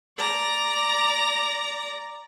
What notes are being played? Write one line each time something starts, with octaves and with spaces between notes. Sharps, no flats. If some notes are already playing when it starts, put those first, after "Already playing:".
D5 A#5